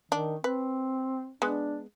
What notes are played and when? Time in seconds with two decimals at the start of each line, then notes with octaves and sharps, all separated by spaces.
0.12 D#3 D4
0.44 C4 B4
1.42 G#3 B3 D4